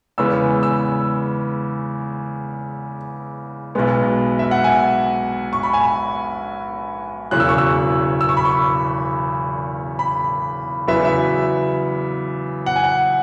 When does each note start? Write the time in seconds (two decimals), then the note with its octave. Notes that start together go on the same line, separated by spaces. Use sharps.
0.18 E2 C#3 G#3 B3 E6
0.63 E6
3.75 B1 B2 G#3 B3
4.39 E5
4.51 F#5
4.64 G#5
5.53 C#6
5.63 B5
5.73 G#5
5.84 B5
7.31 E1 E2 C#3 F#3 F#6
7.40 E6
7.49 C#6
7.58 E6
8.21 E6
8.29 C#6
8.37 B5
8.45 C#6
9.99 B5
10.88 E2 C#3 F#3 B3 E5
11.05 E5
12.66 F#5
12.76 G#5
12.84 F#5